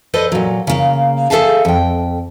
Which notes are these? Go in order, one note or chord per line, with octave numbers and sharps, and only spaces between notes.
A4 B4 C5 D5 D#5
A#2 F#3
C#3 A#3
G#4 A4 B4 E5 F5 A5
F2 G5